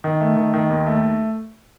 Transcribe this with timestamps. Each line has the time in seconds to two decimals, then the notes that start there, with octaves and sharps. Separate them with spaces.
0.04 D#3
0.21 A3
0.37 D#3
0.54 D#3
0.69 D#2
0.87 A3